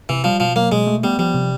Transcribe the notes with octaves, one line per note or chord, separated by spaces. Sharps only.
C3 E3
F3 G3
B2 F3
F#3 A#3
B2 G#3
A3
G3 B3
F3 G3
C3